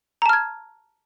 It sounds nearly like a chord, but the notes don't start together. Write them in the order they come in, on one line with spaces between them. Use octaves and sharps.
A#5 A5 F6 G#6